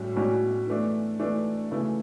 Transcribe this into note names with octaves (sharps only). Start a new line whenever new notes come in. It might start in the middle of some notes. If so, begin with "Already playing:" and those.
Already playing: A2 G3 C#4 F#4
A2 G3 C#4 F#4
E3 A3 D4
E3 A3 D4
C#3 E3 A3 E4